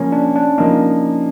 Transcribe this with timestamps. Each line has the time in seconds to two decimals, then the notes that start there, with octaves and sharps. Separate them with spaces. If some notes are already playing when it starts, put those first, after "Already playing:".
Already playing: C#3 F3 A#3 C#4
0.12 D4
0.35 D4
0.58 C#3 F3 A#3 D#4